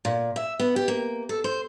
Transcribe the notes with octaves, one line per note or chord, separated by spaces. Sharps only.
A#2
E5
B3
G4
A#3
A4
C5